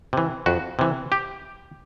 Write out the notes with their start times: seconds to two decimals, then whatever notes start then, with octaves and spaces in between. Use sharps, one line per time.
0.13 C3 E3
0.46 F2 F#4
0.79 C3 E3
1.12 G4